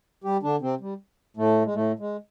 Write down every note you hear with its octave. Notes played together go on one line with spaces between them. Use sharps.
G3 G4
D3 D4
C3 C4
G3
A2 A3
G#3
A2 A3
G#3